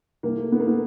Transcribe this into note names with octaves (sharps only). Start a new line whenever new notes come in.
C2 A#3
A3
A3 B3
A#3
A3 B3